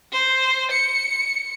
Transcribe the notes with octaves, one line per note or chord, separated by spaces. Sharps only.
C5
C#7